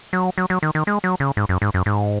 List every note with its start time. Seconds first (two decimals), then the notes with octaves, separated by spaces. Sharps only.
0.13 F#3
0.38 F#3
0.50 F#3
0.63 D#3
0.75 D#3
0.87 G#3
1.04 F#3
1.20 C#3
1.37 G#2
1.49 F#2
1.62 G#2
1.74 F#2
1.86 G#2